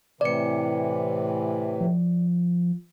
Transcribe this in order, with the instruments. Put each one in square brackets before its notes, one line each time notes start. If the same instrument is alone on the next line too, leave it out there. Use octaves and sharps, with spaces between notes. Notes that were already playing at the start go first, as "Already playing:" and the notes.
[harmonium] A2 C3 E3 [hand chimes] D5 C#7
[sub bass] F3